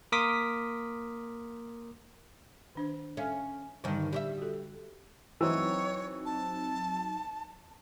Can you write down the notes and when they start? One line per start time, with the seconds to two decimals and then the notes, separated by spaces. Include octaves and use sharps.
0.12 A#3 A#4 C6 D6 D#6 B6
2.75 D#3 D4 C5
3.17 C#4 A4 E5 F5
3.84 G2 D3 D#3 A5
4.13 G3 C#5 E5
4.38 F#4 A4
5.41 E3 F#3 C4 D#4 C#5
6.26 A5